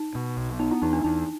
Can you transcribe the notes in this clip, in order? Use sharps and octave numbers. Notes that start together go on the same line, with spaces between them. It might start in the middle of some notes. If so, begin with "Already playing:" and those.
Already playing: D#4
B2
B1
B3 D#4
E4
E2 D#4
D4
E2 D#4